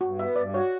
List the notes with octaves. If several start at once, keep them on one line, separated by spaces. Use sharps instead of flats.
G2 F#4
B3 E5
G2 D5
F#4 C#5